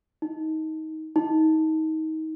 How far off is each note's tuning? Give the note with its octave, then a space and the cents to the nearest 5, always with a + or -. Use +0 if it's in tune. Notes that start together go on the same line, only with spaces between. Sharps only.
D#4 +20
D#4 +25